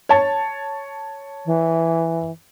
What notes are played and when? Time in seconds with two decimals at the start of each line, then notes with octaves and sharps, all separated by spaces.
0.09 C#5 A5
1.46 E3